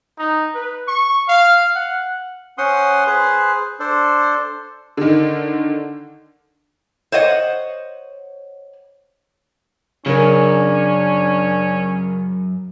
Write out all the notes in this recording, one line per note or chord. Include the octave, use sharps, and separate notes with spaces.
D#4
B4
C#6
F5
F#5
C#4 C5 F#5 C6 D#6
G#4 B4 C5
D4 A4 C5
D3 D#3
C5 C#5 D#5 F#5
F#2 C#3 C#4 D4 A#4